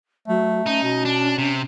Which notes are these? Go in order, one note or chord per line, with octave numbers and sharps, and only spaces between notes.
F#3 A3
C#4 D#4
B2
D4
C3